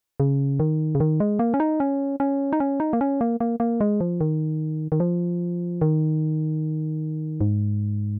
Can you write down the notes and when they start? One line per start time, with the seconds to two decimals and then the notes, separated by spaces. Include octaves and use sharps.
0.20 C#3
0.60 D#3
0.95 C#3
1.00 D#3
1.20 G#3
1.39 A#3
1.54 C#4
1.60 D#4
1.80 C#4
2.20 C#4
2.53 D#4
2.60 C#4
2.80 D#4
2.93 A#3
3.01 C#4
3.21 A#3
3.40 A#3
3.60 A#3
3.81 G#3
4.01 F3
4.21 D#3
4.92 D#3
5.00 F3
5.81 D#3
7.41 G#2